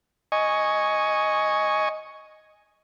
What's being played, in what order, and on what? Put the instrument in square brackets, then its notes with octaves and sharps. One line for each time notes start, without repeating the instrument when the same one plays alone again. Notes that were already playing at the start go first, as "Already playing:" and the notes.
[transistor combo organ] D#5 G#5 C#6